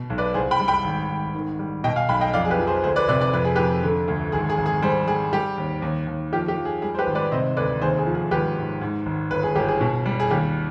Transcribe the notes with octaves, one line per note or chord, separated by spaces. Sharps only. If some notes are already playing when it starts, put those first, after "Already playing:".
Already playing: B2
B1
B4 D5
C2 G#4 C5
G5 B5
G3
G5 B5
G#1
G#1
D#3
G3
B2 D#5 G5
F5 G#5
B1 G5 B5
D#5 G5
F2 D5 F5
G#4
G4 B4
F3
G#4 C5
D2 G#4 C5
B4 D5
C3 B4 D5
B4 D5
F2 B4
G#4
F2 G4 B4
D3
D2
G#1 G#4
G#4
G#1
G#4
G3 G#4 C5
G3 G#4
G3 G4
D#2
D#2
D#2
F3 G4
G4
F3
G#4
G3 G#4
C5
G4 B4
G#1
B4 D5
C3 C5 D#5
D2 B4 D5
D#2 G#4 C5
G#4
F3
G#4
G#1 G4 B4
G#2
G#2
G#1
G1 B4
G#4
G1 G4
G#4
B2
G3
G#4
D#2 G4